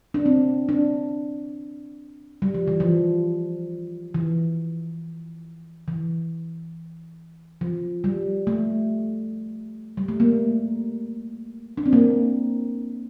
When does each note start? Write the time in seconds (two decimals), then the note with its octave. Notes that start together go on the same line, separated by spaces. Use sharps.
0.14 D4
0.26 C4
0.69 D4
2.42 G3
2.55 F3
2.68 E3
2.80 F3
4.14 E3
5.88 E3
7.61 F3
8.04 G3
8.47 A3
9.97 G3
10.08 A3
10.20 A#3
11.78 D4
11.86 C4
11.93 A#3